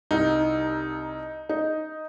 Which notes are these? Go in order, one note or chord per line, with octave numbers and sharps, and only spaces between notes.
C2 D#4
D#4